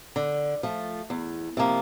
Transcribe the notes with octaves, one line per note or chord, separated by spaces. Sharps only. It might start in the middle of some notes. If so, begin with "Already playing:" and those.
D3
F3 A3
E2
C3 F3 A#3